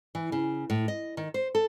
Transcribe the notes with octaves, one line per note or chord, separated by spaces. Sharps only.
E3
C#3
A2
D#5
D#3
C5
A4